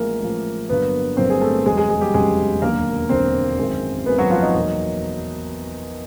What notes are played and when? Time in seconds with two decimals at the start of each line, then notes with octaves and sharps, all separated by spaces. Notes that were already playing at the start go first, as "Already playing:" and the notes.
Already playing: A1 A2 F3 G#3 A#3 A#4
0.21 A1 A2 F3 G#3
0.69 G1 G2 D3 F#3 A#3 B3 B4
1.17 G1 G2 D3 F#3 A#3 C4 C5
1.30 G#4
1.41 A3 A4
1.65 F1 E2 C#3 F#3 G#3 G#4
1.77 G#3 G#4
1.89 G#3 G#4
2.01 G3 G4
2.14 F1 E2 C#3 F#3 G#3 G#4
2.62 E1 D#2 D3 F#3 A#3 A#4
3.09 E1 D#2 D3 F#3 C4 C5
3.58 G#1 F#2 D#3 G#3
4.06 G#1 F#2 D#3 G#3 B3 B4
4.18 F#3 F#4
4.31 F3 F4
4.42 D#4
4.54 E2 B2 F#3 A#3